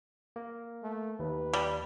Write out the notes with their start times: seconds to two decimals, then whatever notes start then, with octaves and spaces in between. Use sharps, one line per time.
0.36 A#3
0.83 A3
1.19 D#2 B4
1.53 G3